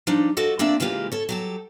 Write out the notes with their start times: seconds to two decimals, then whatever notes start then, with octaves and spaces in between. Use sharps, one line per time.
0.07 F3 G3 D4 D#4
0.37 F3 F#4 A4 D#5
0.59 A#3 C4 D4 F4 D5 E5
0.80 C#3 E3 G#3 A#3 F4 G4
1.12 A4 C#5
1.29 F#3 G4 A4